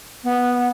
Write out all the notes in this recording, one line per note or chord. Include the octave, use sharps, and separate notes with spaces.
B3